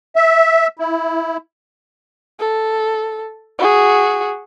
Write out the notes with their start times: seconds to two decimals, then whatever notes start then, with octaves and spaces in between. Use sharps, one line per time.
0.16 E5
0.79 E4
2.40 A4
3.59 F#4 G#4